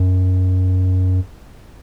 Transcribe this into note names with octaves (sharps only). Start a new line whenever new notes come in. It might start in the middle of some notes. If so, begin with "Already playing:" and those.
Already playing: F#2